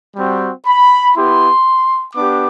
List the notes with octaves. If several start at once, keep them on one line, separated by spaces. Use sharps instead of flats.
G3 C4 F#4
B5
B3 E4 G4 C6
B3 D4 G4 D6